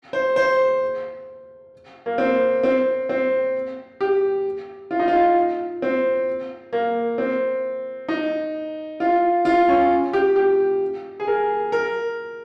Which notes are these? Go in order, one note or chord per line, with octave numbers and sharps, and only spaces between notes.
C5
C5
A#3
C4
C4
C4
G4
F4
D#4
F4
C4
A#3
C4
D#4
F4
F4
C#4
G4
G4
G#4
A#4
A#4